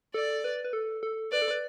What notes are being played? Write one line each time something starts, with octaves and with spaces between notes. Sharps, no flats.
A4 D5
B4
B4
A4
A4
B4 D5
A4
B4